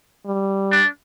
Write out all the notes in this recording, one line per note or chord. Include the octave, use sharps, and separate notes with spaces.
G3
D4